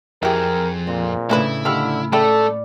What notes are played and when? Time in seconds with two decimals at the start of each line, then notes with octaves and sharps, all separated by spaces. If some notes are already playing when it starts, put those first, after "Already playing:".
0.23 F2 E4 G4 G#4 A#4 G5
0.87 A#2 C4
1.30 A2 C#3 E3 D4 E4 B4
1.65 D3 D#3 G3 F4 B5 E6 F6
2.13 C#3 A3 E4 A4 D5 G5